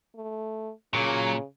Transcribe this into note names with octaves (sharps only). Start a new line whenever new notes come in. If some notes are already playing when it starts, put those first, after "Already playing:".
A3
A#2 C#3 F#3